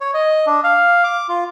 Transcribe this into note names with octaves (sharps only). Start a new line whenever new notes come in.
C#5
D#5
D4
F5
D6
F4